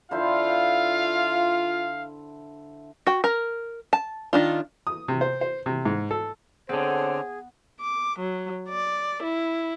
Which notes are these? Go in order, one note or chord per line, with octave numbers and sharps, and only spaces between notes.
D3 E4 F4 C5 F5
F#4 G5
A#4
A5
D#3 D4 F4
D#6
C3
C5
C5
C3
G#2
A4
D3 B3 C4 G#4 A4 C5 C#5
D6
F#3
D5
E4